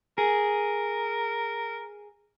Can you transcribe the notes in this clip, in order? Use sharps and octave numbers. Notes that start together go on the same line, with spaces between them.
G#4 A#4